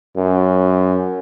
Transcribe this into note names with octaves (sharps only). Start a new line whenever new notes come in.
F#2